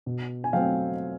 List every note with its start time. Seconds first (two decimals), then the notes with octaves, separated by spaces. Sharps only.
0.06 B2
0.44 G#5
0.53 F#3 A3 C4 F5 G5